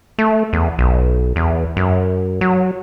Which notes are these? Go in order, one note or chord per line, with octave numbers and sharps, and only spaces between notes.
A3
E2
B1
E2
F#2
F#3